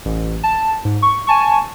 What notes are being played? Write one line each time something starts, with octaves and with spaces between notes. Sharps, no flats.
A1
A5
G#2
C#6
G#5 A5 C#6